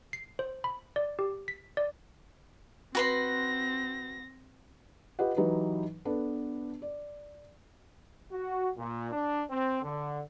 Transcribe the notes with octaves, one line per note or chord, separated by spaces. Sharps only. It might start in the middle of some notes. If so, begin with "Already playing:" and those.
C7
C5
B5
D5
G4
B6
D5
C4 F#4 B4 C6 A#6
F4 G4 B4 D#5 F#5
E3 F#3 D#4 G4 B4
B3 D4 A4 B4
D5
F#4
A#2
D4
C4
D3